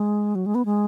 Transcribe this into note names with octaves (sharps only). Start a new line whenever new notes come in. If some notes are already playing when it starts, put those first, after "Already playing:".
Already playing: G#3
F#3
G#3
B3
G#3